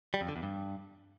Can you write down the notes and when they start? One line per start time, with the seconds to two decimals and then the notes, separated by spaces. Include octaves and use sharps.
0.14 G3
0.21 F2
0.28 D3
0.36 E2
0.43 G2